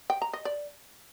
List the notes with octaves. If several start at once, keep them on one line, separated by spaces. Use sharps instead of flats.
G5
A#5
D#5
D5